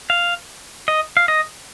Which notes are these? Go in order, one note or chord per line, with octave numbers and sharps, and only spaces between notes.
F5
D#5
F5
D#5